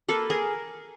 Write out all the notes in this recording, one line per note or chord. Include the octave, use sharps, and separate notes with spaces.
A#3 A4 B4
G#4 A#4